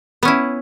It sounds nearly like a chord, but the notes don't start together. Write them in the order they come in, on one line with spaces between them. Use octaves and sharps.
B3 C#4 E4